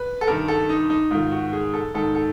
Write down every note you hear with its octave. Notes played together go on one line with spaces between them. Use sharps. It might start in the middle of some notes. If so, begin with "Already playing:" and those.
Already playing: B4
A4
G2 D#3 A#4
A4
D#4
D#4
G#2 D#3 F4
F#4
G#4
A4
G#2 D#3 A4
A4